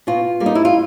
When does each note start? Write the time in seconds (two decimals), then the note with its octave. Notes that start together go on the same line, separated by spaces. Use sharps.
0.07 B2 F4
0.40 G3 A#3
0.46 D#4
0.55 E4
0.65 F4